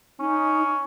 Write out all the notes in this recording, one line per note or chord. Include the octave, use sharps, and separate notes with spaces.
C#4 D#4